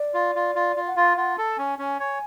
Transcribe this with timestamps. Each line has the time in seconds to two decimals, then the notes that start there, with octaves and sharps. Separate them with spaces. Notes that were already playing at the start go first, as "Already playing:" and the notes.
Already playing: D5
0.14 F4
0.35 F4
0.55 F4
0.76 F4
0.87 F#5
0.96 F4 F5
1.17 F4 F#5
1.38 A4 A5
1.58 C#4 G#5
1.79 C#4 G#5
2.00 C#5